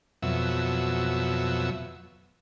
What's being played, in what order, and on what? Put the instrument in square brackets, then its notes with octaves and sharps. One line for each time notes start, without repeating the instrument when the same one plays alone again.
[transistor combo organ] F2 B2 F#3 E5